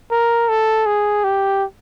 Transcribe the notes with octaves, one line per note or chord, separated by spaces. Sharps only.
A#4
A4
G#4
G4